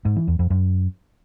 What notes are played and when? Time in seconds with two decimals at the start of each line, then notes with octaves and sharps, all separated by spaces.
0.05 G#2
0.16 E3
0.28 E2
0.39 F2
0.50 F#2